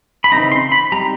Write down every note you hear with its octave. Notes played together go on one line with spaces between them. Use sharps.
B5
C#3 E3 A3 C4 D#4 A#5
C6
B5
G3 C4 D#4 A#5